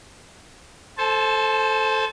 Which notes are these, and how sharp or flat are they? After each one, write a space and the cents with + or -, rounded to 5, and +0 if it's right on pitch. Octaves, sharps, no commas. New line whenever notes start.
A4 +0 C5 +10 A5 -35